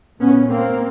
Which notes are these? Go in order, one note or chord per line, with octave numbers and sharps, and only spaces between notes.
A#2 B3 C#4
A#3 C4